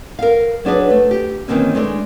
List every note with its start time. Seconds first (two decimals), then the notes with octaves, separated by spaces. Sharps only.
0.19 A#4 F5
0.65 F#3 D4 G#4 B4
0.90 A3
1.11 G4
1.48 D#3 E3 A#3 C4 C#4
1.75 G#3 A3 D4